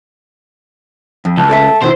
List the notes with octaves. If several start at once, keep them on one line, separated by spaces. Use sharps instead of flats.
F2
C#2 A5
A4 D5 E5
B2 D#3 E4 C5